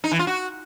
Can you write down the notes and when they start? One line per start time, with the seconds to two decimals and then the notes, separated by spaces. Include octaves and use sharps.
0.04 D#4
0.11 E3
0.19 F4
0.27 F#4